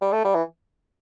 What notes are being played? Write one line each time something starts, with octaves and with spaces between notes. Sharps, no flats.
G3
A3
G3
E3